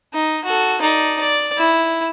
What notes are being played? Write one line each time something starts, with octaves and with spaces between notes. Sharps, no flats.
D#4
F#4 A4
D#4 D5
D5
E4